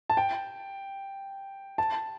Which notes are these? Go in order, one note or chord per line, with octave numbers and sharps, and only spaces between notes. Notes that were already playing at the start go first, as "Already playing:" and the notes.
A5
G5
A5